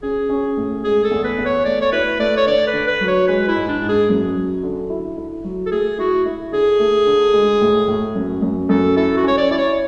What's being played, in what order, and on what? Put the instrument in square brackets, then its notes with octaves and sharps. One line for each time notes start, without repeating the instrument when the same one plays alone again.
[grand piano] C#4 [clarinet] G#4
[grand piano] C#4
A2
[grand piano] G#3 [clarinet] G#4
[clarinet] A4
[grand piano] E2
[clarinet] B4
[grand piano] E2
[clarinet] C#5
[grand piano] A3 [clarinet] D5
[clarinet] C#5
[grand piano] E4 [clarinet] B4
[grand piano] A3 [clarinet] D5
[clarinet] C#5
[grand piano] D3 [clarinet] D5
[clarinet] B4
[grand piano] D3
[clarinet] B4
[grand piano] F#3
[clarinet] C#5
[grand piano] G#3 [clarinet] B4
[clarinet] E4
[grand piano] G#2
[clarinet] D4
[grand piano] G#2
[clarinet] G#4
[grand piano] F#2
F#3
D3
E4
E4
F#3
[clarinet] A4
[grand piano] A3 [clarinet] G#4
[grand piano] E4 [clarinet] F#4
[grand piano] E4
[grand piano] D3 [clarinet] G#4
[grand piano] A3
D3
G#3
A2
A2
F#2
F#2
[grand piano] F#2 [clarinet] A4
[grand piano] E4 [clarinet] A4
[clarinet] F#4
[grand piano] C#4 [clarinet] C#5
[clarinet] D5
[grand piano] E4 [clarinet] D5
[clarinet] C#5